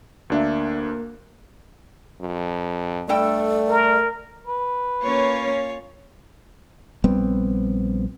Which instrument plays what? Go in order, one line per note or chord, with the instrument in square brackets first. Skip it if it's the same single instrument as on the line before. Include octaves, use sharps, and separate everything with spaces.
[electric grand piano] D2 D4 E5 [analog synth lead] A#3
[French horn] F2
[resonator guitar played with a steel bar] G2 A4 G5 [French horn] A3 [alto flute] D5
[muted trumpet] A#4
[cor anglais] B4
[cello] A#3 C#4 [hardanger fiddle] F4 C#5
[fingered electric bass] A#1 G3 B3 C4